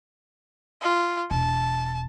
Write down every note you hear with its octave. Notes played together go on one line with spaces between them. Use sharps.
F4
E1 A5